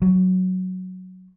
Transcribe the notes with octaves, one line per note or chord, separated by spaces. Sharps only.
F#3